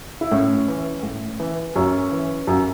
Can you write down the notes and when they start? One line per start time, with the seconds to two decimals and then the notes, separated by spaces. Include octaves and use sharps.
0.21 E4
0.31 A2 C#4
0.68 E3
1.03 A2
1.40 E3
1.75 F#2 C#4
2.12 E3
2.47 F#2